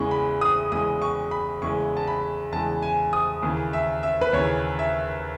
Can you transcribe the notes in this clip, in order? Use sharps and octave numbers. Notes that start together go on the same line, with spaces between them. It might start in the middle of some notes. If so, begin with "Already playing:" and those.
Already playing: E2 C#3 E3 G#3 C#6
B5
D#6
E2 C#3 E3 G#3 D#6
C#6
B5
E2 C#3 E3 G#3 C#6
A5
B5
E2 C#3 E3 G#3 A5
G#5
D#6
D#2 C#3 E3
E5
E5
B4
D#2 C#3 E3 C#5
E5